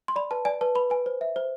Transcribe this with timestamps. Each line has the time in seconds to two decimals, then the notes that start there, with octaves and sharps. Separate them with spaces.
0.08 C6
0.16 D5 B5
0.31 B4 A5
0.45 D5 G#5
0.61 B4 A5
0.75 B4 B5
0.90 B4 G#5
1.06 C5
1.21 E5
1.36 C5